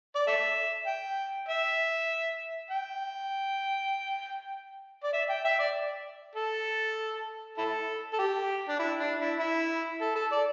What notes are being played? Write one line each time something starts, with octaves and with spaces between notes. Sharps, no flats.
D5
A4 E5
G5
E5
G5
D5
E5
G5
E5
D5
A4
E4 A4
A4
G4
D4
E4
D4
E4
E4
A4
A4
D5